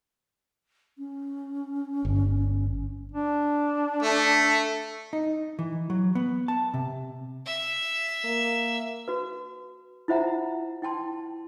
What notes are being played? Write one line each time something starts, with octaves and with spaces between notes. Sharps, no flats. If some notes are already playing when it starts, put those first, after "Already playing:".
C#4
G1
D4
A3
D#4
E3
F#3
B3
A5
C3
E5
A#3
F#4 B4
E4 F4 C5 E5 F#5 A#5
E4 G5 A5 C6